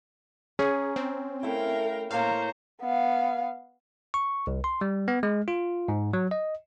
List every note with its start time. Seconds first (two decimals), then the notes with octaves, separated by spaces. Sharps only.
0.59 C#4 G#4 A#5
0.96 C4
1.43 A3 E4 A#4 F5 G5
2.11 A2 A#3 C5 C#5 F5 A#5
2.82 B3 F5
4.14 C#6
4.47 C2
4.64 C6
4.81 G3
5.08 B3
5.23 G#3
5.48 F4
5.88 G#2
6.13 F#3
6.31 D#5